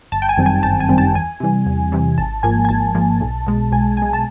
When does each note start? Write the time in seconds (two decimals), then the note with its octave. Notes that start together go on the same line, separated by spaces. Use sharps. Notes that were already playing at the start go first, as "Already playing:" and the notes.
0.12 G1 A5
0.22 G5
0.29 G#5
0.37 F#2 D#3 G3 C4
0.46 G#5
0.63 G1 A5
0.80 G#5
0.89 F#2 D#3 G3 C4
0.98 A5
1.14 E2 G#5
1.40 C3 E3 G3
1.66 E2
1.92 C3 E3 G3
2.18 G#1 A5
2.43 G#2 F3 A#3 G#5
2.65 G#5
2.69 G#1 A5
2.95 G#2 F3 A#3
3.21 B1
3.46 B2 G#3
3.72 B1 G#5
3.97 B2 G#3 G#5
4.13 A5